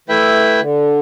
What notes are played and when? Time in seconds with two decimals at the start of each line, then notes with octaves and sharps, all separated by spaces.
0.08 E3 A3 E4 B4 E5 G5
0.33 C#3
0.59 D3